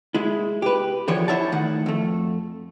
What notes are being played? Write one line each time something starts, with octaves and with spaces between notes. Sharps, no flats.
G#3 E4
G4 B4
D3 E3 F3 G4 C#5
E4 C5 C#5 E5 F#5 A5
A2 D#3 F#5
F2 A3